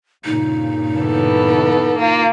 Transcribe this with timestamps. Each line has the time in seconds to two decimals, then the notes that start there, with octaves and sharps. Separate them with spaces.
0.25 G2 A#2 C#3 D#4
1.00 E3 B3 A4
1.98 A#3 F4